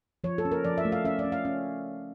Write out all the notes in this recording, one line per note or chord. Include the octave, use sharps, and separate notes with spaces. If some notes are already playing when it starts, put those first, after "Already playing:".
F3 C#5
A4
C#4
A#4
F3 D5
E5
A3
F5
C#4 E5
D5
C#4
F5
C#4